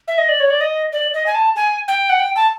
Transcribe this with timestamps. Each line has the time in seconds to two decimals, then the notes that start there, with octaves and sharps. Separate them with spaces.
0.08 E5
0.18 D#5
0.29 D5
0.40 C#5
0.50 D5
0.61 D#5
0.92 D5
1.14 D#5
1.26 G#5
1.35 A5
1.56 G#5
1.88 G5
2.10 F#5
2.20 G5
2.36 A5